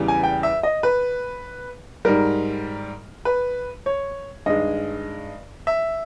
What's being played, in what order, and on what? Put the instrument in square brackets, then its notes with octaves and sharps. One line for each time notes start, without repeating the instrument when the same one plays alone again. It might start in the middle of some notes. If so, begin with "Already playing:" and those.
Already playing: [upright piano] E2 C#3 E3 G3
G#5
G5
E5
D#5
B4
G#2 G3 A#4
B4
C#5
G2 D#3 G#3 D#5
E5